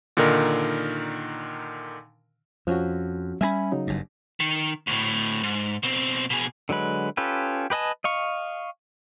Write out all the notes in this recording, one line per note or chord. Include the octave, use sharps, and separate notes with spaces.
A#2 D3 D#3 D#4 A#4
F2 F3 C#4 F#4
G3 G#3 C#4 E5 G#5 B5
C#3 F#3 D#4
F#1 G2
D#3
D2 A2
G#2
B2 C4
B2 G#4
D3 F#3 G#3 B4
C#4 F4 G4 A4 B4
G4 B4 D#5 G#5 A5
D#5 F5 C#6